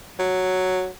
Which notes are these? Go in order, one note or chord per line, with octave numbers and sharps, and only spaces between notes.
F#3